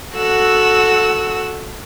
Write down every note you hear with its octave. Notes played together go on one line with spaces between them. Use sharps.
F#4 A4 F#5 E6